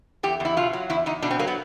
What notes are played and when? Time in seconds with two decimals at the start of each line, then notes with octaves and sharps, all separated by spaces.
0.23 E2 G4
0.40 E2 E4
0.57 B2 F4
0.73 F#3
0.90 E2 E4
1.06 E2 D#4
1.22 B2 D4
1.31 C4
1.39 F#3 A#3
1.47 B3